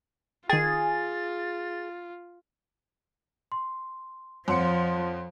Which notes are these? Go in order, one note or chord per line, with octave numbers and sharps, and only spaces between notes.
D#3 F4 G#4 G5 A6
C6
F2 F3 C#5 F#5 C6 C#7